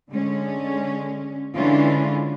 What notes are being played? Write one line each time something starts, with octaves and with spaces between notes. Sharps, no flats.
D3 G#3 C#4
D3 E3 G#3 C#4 D4 F4